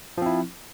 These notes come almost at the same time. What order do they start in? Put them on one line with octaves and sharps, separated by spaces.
F3 C4 E4